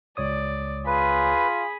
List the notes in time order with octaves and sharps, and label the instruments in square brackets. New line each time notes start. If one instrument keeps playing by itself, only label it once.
[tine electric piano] C#2 C#5 D#6 [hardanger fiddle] D5
[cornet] F4 [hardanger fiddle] G#4 B5 [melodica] B4